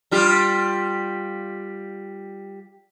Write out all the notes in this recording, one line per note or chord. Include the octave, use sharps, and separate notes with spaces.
G3 F4 G4